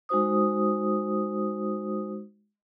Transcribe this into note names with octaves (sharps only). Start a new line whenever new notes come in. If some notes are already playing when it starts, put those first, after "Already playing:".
G#3 D#4 F#4 C5 D#6